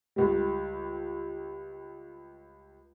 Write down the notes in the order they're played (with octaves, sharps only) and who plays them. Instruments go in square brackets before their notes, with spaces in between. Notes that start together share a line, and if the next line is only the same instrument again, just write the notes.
[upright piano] C#2 G3